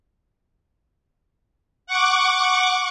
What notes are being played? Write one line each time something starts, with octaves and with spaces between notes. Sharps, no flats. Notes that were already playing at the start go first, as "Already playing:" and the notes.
F#5 C#6 D6